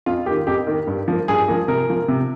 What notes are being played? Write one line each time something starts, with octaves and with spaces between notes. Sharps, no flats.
F2 F4
D#3 A#3 G4
F2 G4
D#3 A#3
G2
F3 A#3
G2 G#4
F3 A#3
C3 A#4
F3 A#3
C3